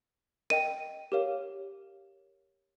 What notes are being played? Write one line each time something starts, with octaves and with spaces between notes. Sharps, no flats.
A#4 D#5 G5 D#7
G4 A#4 C#5 F5